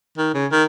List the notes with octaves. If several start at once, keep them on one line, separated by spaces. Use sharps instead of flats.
D#3
C#3
D#3